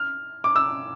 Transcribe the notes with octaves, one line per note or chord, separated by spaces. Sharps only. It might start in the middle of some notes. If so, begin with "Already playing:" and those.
Already playing: F6
D6
E6